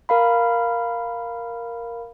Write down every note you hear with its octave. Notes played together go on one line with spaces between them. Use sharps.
A#4 F5 B5